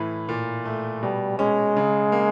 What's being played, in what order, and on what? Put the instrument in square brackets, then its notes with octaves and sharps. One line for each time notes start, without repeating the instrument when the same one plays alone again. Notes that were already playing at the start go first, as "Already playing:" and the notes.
Already playing: [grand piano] A2 E3
A#2
A3
[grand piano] B2 [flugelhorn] G3
[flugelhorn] G#3 [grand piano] C#4
[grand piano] C#3
A#3